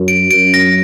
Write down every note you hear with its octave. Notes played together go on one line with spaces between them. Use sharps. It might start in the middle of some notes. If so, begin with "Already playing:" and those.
Already playing: F#2
D7
F#2 D7
A#6